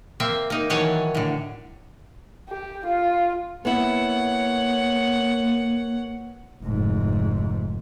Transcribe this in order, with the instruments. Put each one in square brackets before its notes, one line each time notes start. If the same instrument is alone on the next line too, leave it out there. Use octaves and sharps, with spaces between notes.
[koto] A#3 C4 E5
A#3 D#4
D#3 E3 F#3 C#5 G#5 A5
A2 D3
[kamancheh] G4
F4
[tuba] A#3 [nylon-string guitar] B3 E4 [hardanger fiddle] C#5 F#5
[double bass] F1 G#2